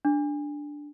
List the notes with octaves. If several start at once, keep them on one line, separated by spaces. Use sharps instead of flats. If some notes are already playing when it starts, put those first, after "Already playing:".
D4